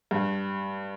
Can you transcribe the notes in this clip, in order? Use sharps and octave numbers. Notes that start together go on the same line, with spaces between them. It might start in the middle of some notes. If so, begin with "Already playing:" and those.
G2